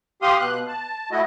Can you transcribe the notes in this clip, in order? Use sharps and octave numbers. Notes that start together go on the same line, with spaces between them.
G4 F5 C6 D#6
B2 F#6
A5
A3 E4 F#4 D#5